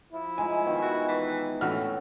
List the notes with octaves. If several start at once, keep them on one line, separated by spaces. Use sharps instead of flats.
F3 E4
G#3 D#4 F4 G#5
B2 D#3 D#4
F#4
E3
A2 E3 C#4 D4 F#4 A4 F6